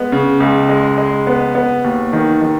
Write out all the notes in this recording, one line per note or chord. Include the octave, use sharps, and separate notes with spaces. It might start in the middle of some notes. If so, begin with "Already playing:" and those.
Already playing: G#3 B3
C#3
C#2
G#3
G#3
B3
B3
D#2
D#3
D#3